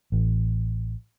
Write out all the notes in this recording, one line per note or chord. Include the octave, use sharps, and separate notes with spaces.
A1